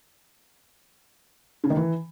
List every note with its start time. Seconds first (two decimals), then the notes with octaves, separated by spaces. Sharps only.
1.64 C#3
1.70 D#3
1.77 E3